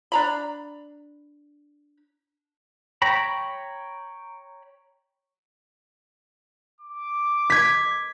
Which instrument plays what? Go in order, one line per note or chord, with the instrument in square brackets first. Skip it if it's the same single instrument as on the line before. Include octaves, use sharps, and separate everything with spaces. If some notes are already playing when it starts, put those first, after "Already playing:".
[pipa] D4 A#5 B5
[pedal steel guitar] C#5 G5 A#5 B5
[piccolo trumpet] D6
[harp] G#6 B6